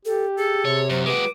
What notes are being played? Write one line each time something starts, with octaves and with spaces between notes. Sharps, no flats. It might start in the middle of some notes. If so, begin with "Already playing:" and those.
G4 A4
G#4 A4
C3 C#5
F#2 C5
G#3 F#4 B4 D6